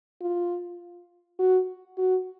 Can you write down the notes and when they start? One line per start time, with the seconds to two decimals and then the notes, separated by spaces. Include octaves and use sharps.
0.21 F4
1.39 F#4
1.98 F#4